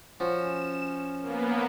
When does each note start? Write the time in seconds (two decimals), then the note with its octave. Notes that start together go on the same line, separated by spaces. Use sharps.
0.20 F3 C#4 F#4 E7
1.21 A#3 B3